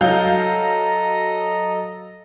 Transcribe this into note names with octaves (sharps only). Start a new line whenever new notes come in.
F#3 A4 D#5 F5 A#5 G6